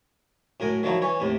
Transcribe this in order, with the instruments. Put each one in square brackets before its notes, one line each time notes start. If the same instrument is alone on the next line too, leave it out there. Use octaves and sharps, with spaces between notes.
[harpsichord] F#2 A2 A#4 G#5
D#3 F3 F#3 D#4 E4
E3 C#4 C#5
D#2 A2 C3